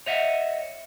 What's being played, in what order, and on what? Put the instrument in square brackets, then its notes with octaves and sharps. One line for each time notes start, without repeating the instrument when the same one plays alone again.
[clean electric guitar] C#5 D#5 E5 F#5